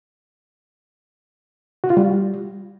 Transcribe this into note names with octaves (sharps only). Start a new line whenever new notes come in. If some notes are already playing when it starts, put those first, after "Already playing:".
F#4
F4
G3